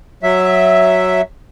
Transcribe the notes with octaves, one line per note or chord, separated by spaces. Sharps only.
F#3 E5